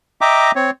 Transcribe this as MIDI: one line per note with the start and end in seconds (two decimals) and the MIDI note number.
0.21 0.51 75
0.21 0.51 76
0.21 0.51 79
0.21 0.51 82
0.21 0.51 86
0.55 0.70 60
0.55 0.70 73